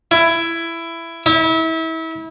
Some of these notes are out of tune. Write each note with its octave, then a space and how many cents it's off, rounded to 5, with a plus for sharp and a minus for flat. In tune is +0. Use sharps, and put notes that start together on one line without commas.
E4 +15
E4 -30